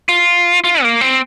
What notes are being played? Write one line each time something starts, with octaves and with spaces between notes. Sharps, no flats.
F4
F4
A#3
C4